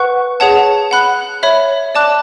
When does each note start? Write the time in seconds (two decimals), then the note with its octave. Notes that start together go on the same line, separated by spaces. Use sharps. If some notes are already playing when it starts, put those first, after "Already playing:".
Already playing: B4 F#5 C#6 F#6
0.40 G#4 C#5 F#5 A5
0.91 F#5 B5 F#6
1.43 C#5 E5 B5
1.95 D5 A5 D6 F#6